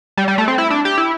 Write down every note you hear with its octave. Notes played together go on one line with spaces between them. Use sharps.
G3
G3
A3
C4
E4
D4
G4
E4